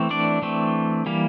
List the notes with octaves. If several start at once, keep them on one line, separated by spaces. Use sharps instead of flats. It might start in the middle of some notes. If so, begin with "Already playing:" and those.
Already playing: E3 A3 C4
D4 D5
E3 A3 C4
E3 G3 A#3